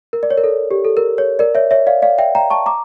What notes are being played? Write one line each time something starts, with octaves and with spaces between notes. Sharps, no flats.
A#4
D5
C#5
A#4
A4
G4
A4
A#4
C#5
A#4 D5
C#5 E5
C#5 E5
D5 F5
D5 F5
E5 G5
G5 A#5
A5 C#6
A#5 D6